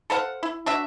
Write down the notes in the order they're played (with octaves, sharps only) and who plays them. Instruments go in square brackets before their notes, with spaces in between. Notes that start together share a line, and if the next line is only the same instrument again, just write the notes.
[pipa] A4 C5 F5 F#5
E4
D4 F#4 E5